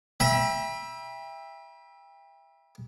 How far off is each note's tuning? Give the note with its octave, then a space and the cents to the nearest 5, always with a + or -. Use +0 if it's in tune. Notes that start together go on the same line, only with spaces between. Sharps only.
E5 +0 G5 +30 B5 -40